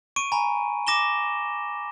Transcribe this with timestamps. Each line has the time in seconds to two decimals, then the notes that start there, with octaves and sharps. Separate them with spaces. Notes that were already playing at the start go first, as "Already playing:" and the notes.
0.16 C#6 D7 D#7
0.32 G#5 A#5 B5
0.87 D6 A#6 E7 G7